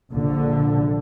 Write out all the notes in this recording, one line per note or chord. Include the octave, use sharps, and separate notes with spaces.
A#1 D3